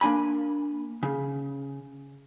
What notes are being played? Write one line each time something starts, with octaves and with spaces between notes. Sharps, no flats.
A#3 D4 G#5 B5
C#3